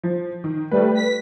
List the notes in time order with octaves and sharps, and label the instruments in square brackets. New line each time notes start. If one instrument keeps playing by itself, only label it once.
[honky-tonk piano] F3
D#3
[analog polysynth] G3 A3 [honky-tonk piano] B4
[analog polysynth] B6